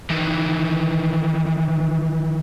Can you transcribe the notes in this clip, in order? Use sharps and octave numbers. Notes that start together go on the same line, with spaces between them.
D#3 E3